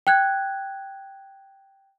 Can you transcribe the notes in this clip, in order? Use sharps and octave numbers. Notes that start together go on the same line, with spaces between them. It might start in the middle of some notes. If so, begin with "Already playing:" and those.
G5 F#6 G#6